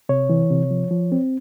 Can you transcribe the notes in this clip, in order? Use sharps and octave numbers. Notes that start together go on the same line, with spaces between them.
C3 C#5
E3
C3
F3
F3
C4